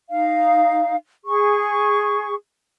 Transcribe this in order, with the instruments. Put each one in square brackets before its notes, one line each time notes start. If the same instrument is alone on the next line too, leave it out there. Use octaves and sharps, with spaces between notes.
[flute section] D#4 F5
G#4 C#6